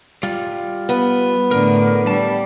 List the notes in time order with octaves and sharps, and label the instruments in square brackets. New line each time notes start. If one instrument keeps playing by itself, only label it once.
[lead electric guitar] G3 F4
[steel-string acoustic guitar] B3
[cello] A2 D3 [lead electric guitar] A#4
[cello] G3 [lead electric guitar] A5